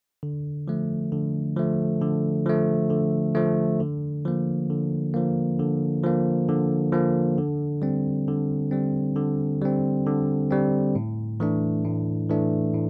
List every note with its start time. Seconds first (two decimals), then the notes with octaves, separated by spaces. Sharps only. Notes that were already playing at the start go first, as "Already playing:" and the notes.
0.23 D3
0.68 F3 A3
1.12 D3
1.57 F3 A3
2.01 D3
2.46 F3 A3
2.90 D3
3.35 F3 A3
3.80 D3
4.25 F3 A#3
4.70 D3
5.14 F3 A#3
5.60 D3
6.03 F3 A#3
6.49 D3
6.93 F3 A#3
7.38 D3
7.82 G3 C4
8.28 D3
8.71 G3 C4
9.16 D3
9.62 G3 C4
10.06 D3
10.51 G3 C4
10.95 A2
11.40 E3 A3 D4
11.85 A2
12.30 E3 A3 D4
12.74 A2